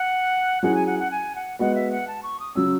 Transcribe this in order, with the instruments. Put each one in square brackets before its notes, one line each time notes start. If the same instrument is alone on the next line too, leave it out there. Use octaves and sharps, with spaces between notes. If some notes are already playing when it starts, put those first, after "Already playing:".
Already playing: [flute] F#5
[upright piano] F#3 C#4 E4 G#4 [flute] F#5
[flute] G#5
F#5
F#5
G#5
F#5
[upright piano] G#3 B3 F#4 [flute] F#5
[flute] E5
F#5
A5
C#6
D#6
[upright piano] C#3 F#3 C#4 [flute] E6